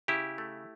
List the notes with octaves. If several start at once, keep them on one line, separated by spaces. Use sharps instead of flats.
C#3 E4 G4
A3